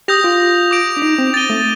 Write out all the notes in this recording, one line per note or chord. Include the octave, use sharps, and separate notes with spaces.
G4 D#6 G6 A#6 F7
F4
D6 G6 D7 F7
D4
D#4
C4
A6 D#7 G7
A3